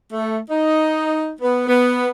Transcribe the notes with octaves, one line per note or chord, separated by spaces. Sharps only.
A3
D#4
B3
B3